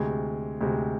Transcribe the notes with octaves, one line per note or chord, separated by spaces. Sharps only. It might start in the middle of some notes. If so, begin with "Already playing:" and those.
Already playing: D2 C3 G#3
D2 C3 G#3